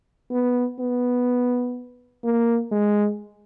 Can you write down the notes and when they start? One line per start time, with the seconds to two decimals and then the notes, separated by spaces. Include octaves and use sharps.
0.31 B3
0.80 B3
2.24 A#3
2.72 G#3